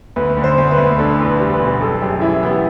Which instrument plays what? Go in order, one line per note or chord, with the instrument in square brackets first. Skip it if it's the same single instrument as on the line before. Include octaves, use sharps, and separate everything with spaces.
[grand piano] D2 [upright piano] B4
[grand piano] D3
[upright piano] C5
[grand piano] D2
[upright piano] B4
[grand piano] D2
[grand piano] D4 [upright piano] A4
[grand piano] E2
[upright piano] B4
[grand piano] G3
[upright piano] B4
[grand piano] B2
[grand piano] F#1 [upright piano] A4
[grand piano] F#2 [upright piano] G4
[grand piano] E3 [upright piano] E4
[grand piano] B3 [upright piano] G4